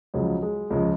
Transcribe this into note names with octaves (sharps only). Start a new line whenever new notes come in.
C#2 C#3 F3 F#3
G#3
C#2 C#3 F3 G#3